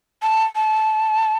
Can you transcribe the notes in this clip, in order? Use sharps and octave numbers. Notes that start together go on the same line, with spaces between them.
A5
A5